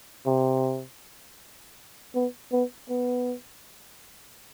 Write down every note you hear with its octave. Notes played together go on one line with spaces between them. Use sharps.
C3
B3
B3
B3